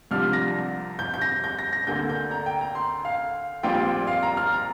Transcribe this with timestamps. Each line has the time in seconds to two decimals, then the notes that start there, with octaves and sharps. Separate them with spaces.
0.11 C2 C3 F3 D4 F6
0.33 A#6
0.99 G6
1.14 G6
1.22 A#6
1.44 G6
1.59 A#6
1.73 A#6
1.87 D2 D3 A#3 G6
2.09 G6
2.31 A#5
2.46 G5
2.61 A#5
2.75 C6
3.05 F5
3.63 A#1 A#2 G3 C4 F4 G5
4.07 F5
4.23 A#5
4.37 F6
4.52 A#5